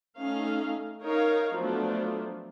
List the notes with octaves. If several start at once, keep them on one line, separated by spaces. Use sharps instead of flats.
A3 C#4 D#4 F5
D#4 A#4 C#5 F5
F3 F#3 A3 B3 D4